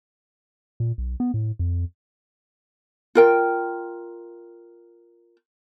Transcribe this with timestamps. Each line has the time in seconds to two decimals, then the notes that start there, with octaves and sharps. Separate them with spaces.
0.80 A#2
0.98 B1
1.20 B3
1.34 A2
1.59 F2
3.15 F4 A#4 G5